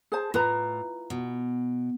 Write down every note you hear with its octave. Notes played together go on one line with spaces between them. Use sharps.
G#4 C5 A5
A2 F4 B4 A#5
B2